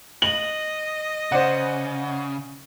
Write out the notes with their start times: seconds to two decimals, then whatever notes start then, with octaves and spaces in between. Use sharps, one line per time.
0.22 D#5 F#7
1.32 C#3 C5 D5 F#5